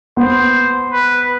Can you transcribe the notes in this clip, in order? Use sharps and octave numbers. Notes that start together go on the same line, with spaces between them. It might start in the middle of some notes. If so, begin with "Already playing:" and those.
B3 C5
B4